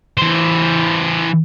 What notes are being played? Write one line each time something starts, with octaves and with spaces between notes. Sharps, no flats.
E3 C5